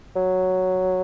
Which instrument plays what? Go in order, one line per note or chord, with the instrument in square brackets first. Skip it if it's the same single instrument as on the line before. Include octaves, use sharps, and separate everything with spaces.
[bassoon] F#3